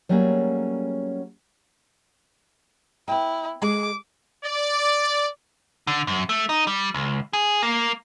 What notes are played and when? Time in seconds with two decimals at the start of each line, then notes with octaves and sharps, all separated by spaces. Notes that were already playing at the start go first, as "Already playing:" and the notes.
0.09 F#3 G3 A3 A#3 C#4 G#4
3.08 B3 E4 G5
3.62 G#3 G#4 D6
4.44 D5
5.87 D3
6.07 F#2
6.29 A3
6.49 D#4
6.67 G3
6.94 C#2
7.33 G#4
7.63 A#3